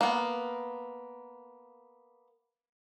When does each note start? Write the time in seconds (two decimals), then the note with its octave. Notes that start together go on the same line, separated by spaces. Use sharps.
0.01 A#3 B3